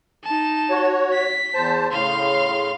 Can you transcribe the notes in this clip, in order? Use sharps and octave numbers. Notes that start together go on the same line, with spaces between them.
D#4 A5
F#4 C#5
B6
E2 C5 A5
A2 C#3 F5 C6